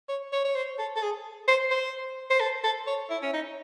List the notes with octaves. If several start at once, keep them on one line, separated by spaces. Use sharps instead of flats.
C#5
C#5
C#5
C5
A4
A4
G#4
C5
C5
C5
A4
A4
C#5
E4
C#4
D#4